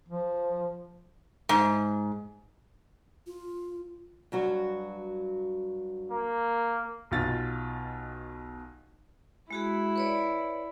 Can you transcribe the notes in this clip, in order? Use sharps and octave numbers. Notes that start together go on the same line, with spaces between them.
F3
G#2
F4
G2 F#3 F#4
A#3
B1 B2 F4 A6
G#3 E4 F#4 G#4
B4 C#5 D5